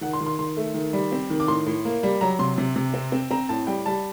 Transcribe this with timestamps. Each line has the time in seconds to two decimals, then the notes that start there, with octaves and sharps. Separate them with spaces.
0.01 D#3 F#5
0.13 C6
0.21 D#3
0.26 C6
0.39 D#3 C6
0.57 A3
0.74 D#3
0.93 G3
1.12 C4
1.30 D#3
1.40 D6
1.47 A2 C6
1.67 A2
1.85 A#3
2.03 G3
2.21 F#3 A#5
2.39 C3 C6
2.58 C3
2.76 C3
2.94 C4
3.12 C4
3.31 C4 A#5
3.49 A2 A5
3.67 G3 G5
3.86 G3 A5